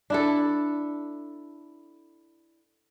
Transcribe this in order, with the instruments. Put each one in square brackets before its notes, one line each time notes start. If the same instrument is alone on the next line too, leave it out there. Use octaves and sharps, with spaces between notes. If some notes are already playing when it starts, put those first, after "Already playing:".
[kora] D4 E4 A4